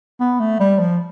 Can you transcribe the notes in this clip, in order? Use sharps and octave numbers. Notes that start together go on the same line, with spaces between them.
B3
A3
G3
F3